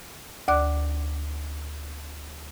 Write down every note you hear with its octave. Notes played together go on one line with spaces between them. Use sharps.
D2 D5 D6 F#6